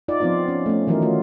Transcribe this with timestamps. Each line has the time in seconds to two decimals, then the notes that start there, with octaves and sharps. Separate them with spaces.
0.08 D#4 F4 D5
0.21 F3 B3 C4 D#4 F4
0.48 C#4
0.66 A3 C#4
0.87 D#3 E3 F#3 D#4 A#4
1.02 A3 F4